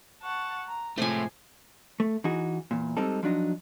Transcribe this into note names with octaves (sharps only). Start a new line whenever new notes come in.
F#5 A5 C#6
A#5
A2 C3 F3 G#3 A3 C5 G#5
A3
E3 D#4 F#4 G#4
E2 A#2
G3 G#3 C4 D#4 A4
F3 F#3 D4 D#4